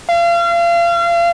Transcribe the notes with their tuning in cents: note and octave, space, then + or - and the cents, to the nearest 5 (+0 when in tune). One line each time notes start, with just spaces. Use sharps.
F5 -35